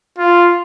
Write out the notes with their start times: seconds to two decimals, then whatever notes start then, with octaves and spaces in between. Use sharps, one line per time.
0.18 F4